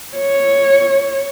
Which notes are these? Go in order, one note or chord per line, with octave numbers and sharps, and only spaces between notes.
C#5